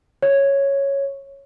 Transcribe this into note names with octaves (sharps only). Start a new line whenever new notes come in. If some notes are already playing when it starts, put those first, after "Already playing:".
C#5